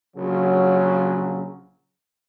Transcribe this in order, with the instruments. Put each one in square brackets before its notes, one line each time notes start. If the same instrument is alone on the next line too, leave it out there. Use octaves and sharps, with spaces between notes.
[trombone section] A#1 C#3 F#3